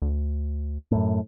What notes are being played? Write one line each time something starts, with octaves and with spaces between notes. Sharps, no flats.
D2
F#2 A2